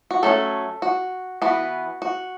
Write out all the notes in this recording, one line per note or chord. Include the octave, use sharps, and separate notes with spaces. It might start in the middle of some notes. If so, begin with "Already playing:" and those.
F#4
F#3 A3 C#4 A4
F#4
E3 B3 F#4
F#4